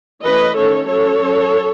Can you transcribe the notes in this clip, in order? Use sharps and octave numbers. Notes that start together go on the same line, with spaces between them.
E3 A3 C#4 B4 D#5
D#3 A3 C#4 A4 C#5
F#3 C#4 A4 C#5
F#3 C#4